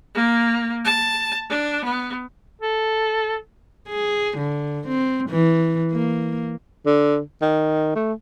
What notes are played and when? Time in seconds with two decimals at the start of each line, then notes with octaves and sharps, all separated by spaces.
0.15 A#3
0.85 A5
1.50 D4
1.84 B3
2.61 A4
3.89 G#4
4.37 D3
4.87 C4
5.30 E3
5.92 A#3
6.86 D3
7.42 D#3
7.95 A3